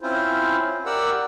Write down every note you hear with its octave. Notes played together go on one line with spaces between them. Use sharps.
C4 C#4 E4 F4 C5
G4 A#4 D5 F#5 E6